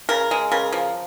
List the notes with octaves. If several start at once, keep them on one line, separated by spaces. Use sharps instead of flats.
C#3 A#4
G#3
C#3 A#4
F3